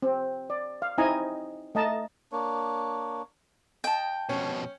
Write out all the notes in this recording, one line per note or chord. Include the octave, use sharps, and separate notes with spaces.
C4
D5
F5
C4 D#4 E4 D#5 G#5 A#5
A3 D#5 A5 A#5
A#3 D4 C#5
D#5 G5 A5
F2 B2 C#4